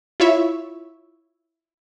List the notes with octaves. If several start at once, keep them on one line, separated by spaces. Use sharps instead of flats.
E4 F4 C#5 E5